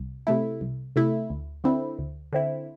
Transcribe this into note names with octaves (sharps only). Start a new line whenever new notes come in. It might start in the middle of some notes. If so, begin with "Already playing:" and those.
Already playing: C2
C3 A3 E4
C2
C3 A3 E4
D2
D3 C4 E4
D2
D3 C4 E4